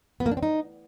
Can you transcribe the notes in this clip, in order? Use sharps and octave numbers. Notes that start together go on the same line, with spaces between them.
B3
A#3
D4
C4
D#4